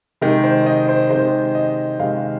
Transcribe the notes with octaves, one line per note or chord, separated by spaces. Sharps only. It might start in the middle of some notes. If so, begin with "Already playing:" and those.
C3 D#3 G#3
C5
D#5
C5
C3 D#3 G#3 C5
D#5
C3 D#3 G#3 F5